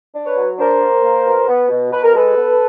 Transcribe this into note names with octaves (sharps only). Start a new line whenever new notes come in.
D4
B4 C#5
F#3
D4 A#4 C5
A#3
A#3
B2
B3
B2
B2 B4
A#4
G#3 A4 B4
B3